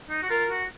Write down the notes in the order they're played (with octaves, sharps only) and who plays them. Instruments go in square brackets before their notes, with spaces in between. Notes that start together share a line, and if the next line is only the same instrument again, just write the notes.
[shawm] D#4
F#4
[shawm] F4 [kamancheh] A#4
[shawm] F#4